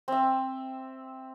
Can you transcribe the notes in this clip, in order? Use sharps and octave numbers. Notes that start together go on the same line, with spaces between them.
C4 E5